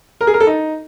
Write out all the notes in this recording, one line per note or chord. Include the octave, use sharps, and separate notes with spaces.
A#4
G#4
A#4
A4
D#4